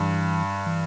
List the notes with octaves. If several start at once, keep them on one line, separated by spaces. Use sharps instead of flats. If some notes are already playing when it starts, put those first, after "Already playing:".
Already playing: G2 E3
E3